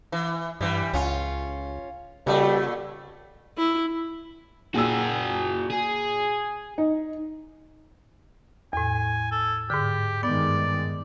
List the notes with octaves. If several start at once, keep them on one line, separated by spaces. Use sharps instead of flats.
E3
G2 E3 G3
C#2 C#4 F4
A#2 C#3 G3 A3
E4
A#2 F#4 G#4 E6
G#4
D#4
E2 A2 G#5
A4
G#2 D3 G4
G2 D#3 G#3 B3 D5